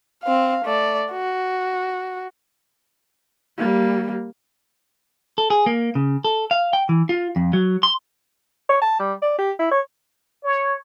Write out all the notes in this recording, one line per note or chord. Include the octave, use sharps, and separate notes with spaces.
C4 F5
A3 D5
F#4
G3 A#3
A4
G#4
A#3
C#3
A4
F5
G5
E3
F4
F2
F#3
C6
C#5
A5
G3
D5
G4
E4
C#5
C#5